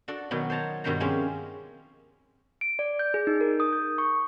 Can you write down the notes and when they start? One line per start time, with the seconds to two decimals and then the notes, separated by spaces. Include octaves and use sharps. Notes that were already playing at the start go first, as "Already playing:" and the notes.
0.08 D4 F#4 A4 D5
0.31 B2 D#3 F#3 B3
0.50 C5 C#5 A5 A#5
0.84 G2 B2 D#3 F#3 C5 A#5
1.00 F3 G#3 C4 C#4 G4
2.61 D7
2.79 D5
2.99 G6
3.14 G#4
3.27 D#4
3.41 A#4
3.60 D#6
3.73 G6
3.98 C#6